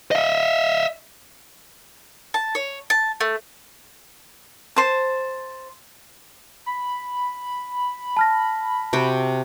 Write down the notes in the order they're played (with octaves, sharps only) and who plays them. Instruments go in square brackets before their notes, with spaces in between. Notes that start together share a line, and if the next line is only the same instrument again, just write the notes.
[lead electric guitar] D#5 E5
[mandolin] A5
C#5
A5
A3
[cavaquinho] C5 A5
[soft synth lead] B5
[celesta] A5 F6 A#6
[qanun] C3 F#4 G5